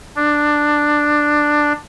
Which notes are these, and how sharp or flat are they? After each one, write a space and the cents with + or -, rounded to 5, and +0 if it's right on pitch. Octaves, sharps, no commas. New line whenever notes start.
D4 +10